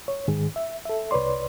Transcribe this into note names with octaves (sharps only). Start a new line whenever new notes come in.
C#5
G#2 D#3 G#4
E5
A4 E5
C2 B4 C#5 D5 C6